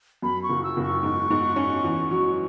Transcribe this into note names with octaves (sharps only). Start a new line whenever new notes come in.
F#2 B5
C#6
F#1
E6
F#1
C#6
G#2
G#2
C#4
E2
F#3